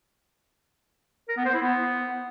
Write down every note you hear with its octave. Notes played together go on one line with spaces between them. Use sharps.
A#4
B3
C5
E4
B3